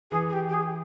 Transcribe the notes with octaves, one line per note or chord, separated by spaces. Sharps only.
E3 G#4
G#4
G4
G4
G#4